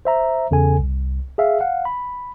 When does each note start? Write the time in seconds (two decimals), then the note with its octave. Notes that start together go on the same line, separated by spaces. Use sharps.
0.05 C5 E5 A#5
0.51 E2 C#3 A4 G#5
0.79 C2
1.38 G#4 E5 F5
1.60 F5 F#5
1.85 B5